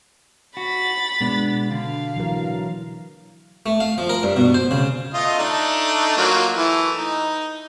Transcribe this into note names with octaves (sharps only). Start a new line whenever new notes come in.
F#4 B5 A6
B2 G#3 B3 D4
D3 F5
E3 F#3 A#4
A3
F5
F3
A#4
G2
B2
C5
C#3
A3 F4 D#5
A3 D4 D#4
F#3 A#3 F4
E3 A3
D#4